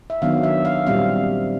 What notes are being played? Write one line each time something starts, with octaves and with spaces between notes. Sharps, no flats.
E5
D#3 F#3 B3 D4 F5
E5
F5
A#2 G3 C4 F5